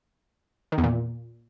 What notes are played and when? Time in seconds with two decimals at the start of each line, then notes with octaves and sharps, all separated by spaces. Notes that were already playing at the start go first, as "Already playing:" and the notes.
0.72 D#3
0.78 E2
0.84 A#2